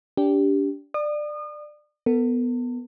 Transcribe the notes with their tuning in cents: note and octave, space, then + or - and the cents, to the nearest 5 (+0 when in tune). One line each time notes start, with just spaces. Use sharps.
D4 -30 G4 +0
D5 +20 D#6 -35
B3 +0 A4 +45